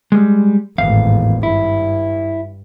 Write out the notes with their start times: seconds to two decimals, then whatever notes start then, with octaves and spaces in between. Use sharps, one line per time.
0.12 G3 G#3
0.78 G#1 E2 A2 F5
1.43 G2 E4